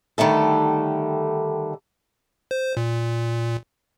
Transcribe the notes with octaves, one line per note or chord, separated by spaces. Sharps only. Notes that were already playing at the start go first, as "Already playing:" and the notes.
D3 D#3 G3 A3 A4
C5
A#2